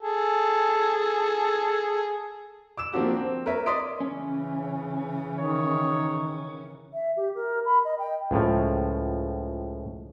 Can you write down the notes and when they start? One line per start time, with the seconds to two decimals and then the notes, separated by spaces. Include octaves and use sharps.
0.01 G#4 A4
2.77 D6 E6 E7
2.93 F3 A#3 C4 D4 F#4 G4
3.17 C4
3.46 A#4 B4 C#5 E5
3.66 D5 D#5 C6 D#6 B6 D7
4.00 C#3 E3 C#4
5.39 D#3 C#5
6.94 E5
7.17 G4
7.35 A#4
7.66 B5
7.85 D#5
7.99 G5
8.31 C#2 A2 F3